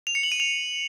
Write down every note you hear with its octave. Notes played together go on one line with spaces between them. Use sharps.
F7
C#7
F#7
D#7
F7